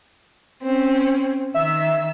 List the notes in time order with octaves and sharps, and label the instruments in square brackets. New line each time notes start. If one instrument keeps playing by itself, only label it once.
[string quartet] C4 C#4
[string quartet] D#3 E6 [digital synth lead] E5